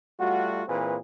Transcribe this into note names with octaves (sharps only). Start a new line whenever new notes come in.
G3 A3 F4 F#4
A#2 E3 C4 G#4 B4